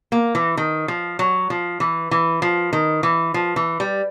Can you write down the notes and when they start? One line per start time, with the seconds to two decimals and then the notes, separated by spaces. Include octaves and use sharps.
0.12 A#3
0.35 E3
0.57 D#3
0.88 F3
1.19 F#3
1.50 F3
1.80 E3
2.11 E3
2.42 F3
2.73 D#3
3.03 E3
3.34 F3
3.56 E3
3.80 G3